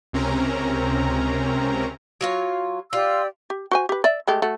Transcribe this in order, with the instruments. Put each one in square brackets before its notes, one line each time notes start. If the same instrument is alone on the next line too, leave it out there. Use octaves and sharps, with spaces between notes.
[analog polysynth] C#2 C3 C4 C#4 A#4 A#5
[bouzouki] F#3 F4 C#5
[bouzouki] F4 [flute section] G4 D5 E6
[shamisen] G4
F#4 C5 G#5
G4 B4
D5 E5
G#3 A3 G4
A3 F#4